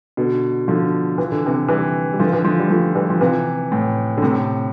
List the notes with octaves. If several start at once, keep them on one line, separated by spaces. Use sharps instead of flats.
B2 D3
D3 F3
E3
D3
C3 E3
E3 G3
G3
D3 F3
E3
D3 F3
G3
F3 A3
E3 G3
F3
C3 E3
A2
D3
A2 C3